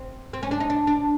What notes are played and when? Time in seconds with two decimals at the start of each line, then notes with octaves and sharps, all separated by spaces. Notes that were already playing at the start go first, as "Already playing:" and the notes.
Already playing: C4
0.33 C4
0.43 C#4
0.51 D4
0.60 D#4
0.70 D4
0.87 D4